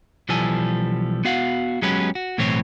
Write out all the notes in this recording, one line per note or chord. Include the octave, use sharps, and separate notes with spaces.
B1 E3 F3 G3 A4 G#5
B3 F#4 F5 F#5
F#3 G#3 B3 C#4 G4 B4
F#4
B1 A2 E3 C4 C#5